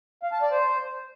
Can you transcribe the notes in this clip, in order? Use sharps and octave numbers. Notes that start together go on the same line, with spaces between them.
F5
A5
D5
C5